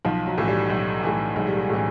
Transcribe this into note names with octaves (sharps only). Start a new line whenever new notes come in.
B1 F3
F#3
A2 E3
G3
B1
A2 E3
B1 G#3
G3
G#3
A2 E3